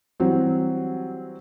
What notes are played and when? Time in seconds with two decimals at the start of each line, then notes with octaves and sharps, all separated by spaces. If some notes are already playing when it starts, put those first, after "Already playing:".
0.20 E3 F#3 G3 C4